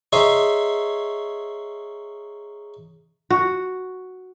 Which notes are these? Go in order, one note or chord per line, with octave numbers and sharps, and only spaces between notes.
C#4 D#4 G#4 C5 E5 G#5
F#4